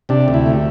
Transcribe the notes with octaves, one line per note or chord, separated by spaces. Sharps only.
C3 D4
D2
E4
A3